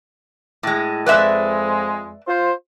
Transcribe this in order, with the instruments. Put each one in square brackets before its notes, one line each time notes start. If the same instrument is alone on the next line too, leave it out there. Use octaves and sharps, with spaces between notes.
[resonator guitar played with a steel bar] A2 G#3
[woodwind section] F2 G#3 [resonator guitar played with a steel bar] B4 D5 E5
[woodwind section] F4 C5